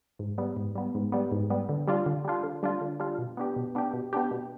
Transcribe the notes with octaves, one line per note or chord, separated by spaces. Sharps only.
G#2
G3 B3
G#2
G3 B3
G#2
G3 B3
G#2
G3 B3
D3
G3 D4 F4
D3
G3 D4 F4
D3
G3 D4 F4
D3
G3 D4 F4
B2
B3 D4 G4
B2
B3 D4 G4
B2
B3 D4 G4
B2